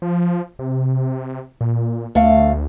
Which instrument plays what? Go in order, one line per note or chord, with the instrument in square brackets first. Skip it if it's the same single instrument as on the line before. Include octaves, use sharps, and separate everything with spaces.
[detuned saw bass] F3
C3
A#2
[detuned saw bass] D2 [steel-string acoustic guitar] A3 F5